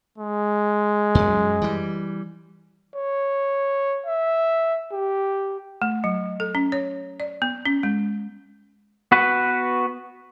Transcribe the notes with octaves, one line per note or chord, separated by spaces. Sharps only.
G#3
F#2 F#3
E3 G3
C#5
E5
G4
A3
F#3
A4
C#4
C#5
D5
B3
C#4
G#3
B3 F#4 B4